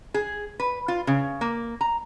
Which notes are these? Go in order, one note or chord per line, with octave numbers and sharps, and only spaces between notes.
G#4
B4
F4
C#3
A#3
A#5